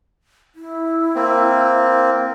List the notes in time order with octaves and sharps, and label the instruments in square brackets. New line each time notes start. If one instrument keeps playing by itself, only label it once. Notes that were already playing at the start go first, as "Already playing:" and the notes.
[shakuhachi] E4
[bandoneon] A#3 C4